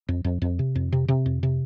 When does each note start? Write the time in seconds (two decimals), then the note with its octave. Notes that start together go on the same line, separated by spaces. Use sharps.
0.08 F2
0.24 F2
0.42 F2
0.59 C3
0.75 F2
0.92 C3
1.08 C3
1.26 F2
1.43 C3